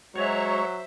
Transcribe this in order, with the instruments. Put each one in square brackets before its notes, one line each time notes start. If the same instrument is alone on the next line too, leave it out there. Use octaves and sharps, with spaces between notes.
[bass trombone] F#3 [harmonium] G#3 F#4 A#5 [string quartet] C5 E5 [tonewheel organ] C#5